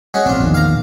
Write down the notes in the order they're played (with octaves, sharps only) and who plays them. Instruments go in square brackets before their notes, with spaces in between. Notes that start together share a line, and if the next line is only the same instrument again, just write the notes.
[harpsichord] G#3 C#4 F#4
[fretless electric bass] A#1 C4 [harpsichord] D4 F4
[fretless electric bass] A#1 E2 D#3
[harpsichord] F5 A#5